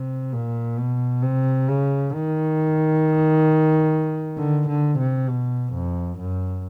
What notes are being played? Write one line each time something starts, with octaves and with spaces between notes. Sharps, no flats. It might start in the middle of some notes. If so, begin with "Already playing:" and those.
Already playing: C3
A#2
B2
C3
C#3
D#3
D3
D3
C3
B2
F2
F#2